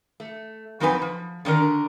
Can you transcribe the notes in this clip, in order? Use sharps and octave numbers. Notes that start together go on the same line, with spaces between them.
A3
F2 F#3 C4 D#4 B4 G#5
F3
D3 D#3 D4 A#4